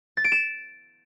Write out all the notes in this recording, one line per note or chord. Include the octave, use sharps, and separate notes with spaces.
A6
D7
E7